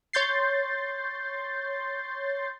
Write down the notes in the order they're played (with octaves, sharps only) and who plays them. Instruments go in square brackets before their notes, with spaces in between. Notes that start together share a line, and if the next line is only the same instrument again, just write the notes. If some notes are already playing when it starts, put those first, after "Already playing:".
[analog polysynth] C#5 C6 G6 A6 C7